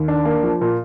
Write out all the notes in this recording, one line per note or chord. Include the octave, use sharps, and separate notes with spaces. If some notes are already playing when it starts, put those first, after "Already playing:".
Already playing: D#2
D4
A#3
F3
A#2